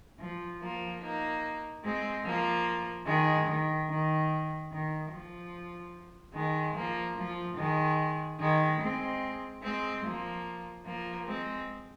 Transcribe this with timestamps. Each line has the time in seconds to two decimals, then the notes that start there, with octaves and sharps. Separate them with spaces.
0.20 F3
0.61 F3 A#3
1.02 A#3 D#4
1.83 G#3 C4
2.25 F3 A#3
3.06 D#3 G#3
3.47 D#3
3.89 D#3
4.71 D#3
5.12 F3
6.34 D#3 G#3
6.75 F3 A#3
7.16 F3
7.57 D#3 G#3
8.39 D#3 G#3
8.80 G#3 C4
9.62 G#3 C4
10.04 F3 A#3
10.85 F3 A#3
11.26 G#3 C4